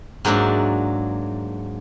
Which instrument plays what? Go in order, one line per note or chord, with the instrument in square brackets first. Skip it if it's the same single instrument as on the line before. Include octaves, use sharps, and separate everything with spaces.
[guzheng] G#2 F#3 A#3 D4 E5